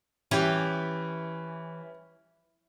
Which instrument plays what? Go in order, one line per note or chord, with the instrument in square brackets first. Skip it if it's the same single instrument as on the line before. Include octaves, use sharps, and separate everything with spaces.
[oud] E3 [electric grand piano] C#4 G4